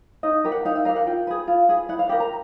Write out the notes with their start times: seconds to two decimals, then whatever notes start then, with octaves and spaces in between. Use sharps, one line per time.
0.23 D#4 D#5
0.44 G4 A#4
0.52 F#5
0.65 D#4 F5
0.75 E5
0.85 G4 A#4 F5
0.96 F#5
1.06 F4 G5
1.27 G#4 B4
1.47 F4
1.69 G#4 B4
1.89 E4 F#5
1.99 F5
2.09 G4 A#4 G5
2.20 A#5